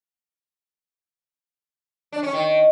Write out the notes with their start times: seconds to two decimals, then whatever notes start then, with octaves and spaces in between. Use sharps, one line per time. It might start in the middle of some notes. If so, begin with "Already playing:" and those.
2.12 D4
2.23 C#4
2.33 D#3